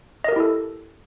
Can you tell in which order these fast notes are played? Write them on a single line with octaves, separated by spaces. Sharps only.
D#5 A#4 G4 E4 A4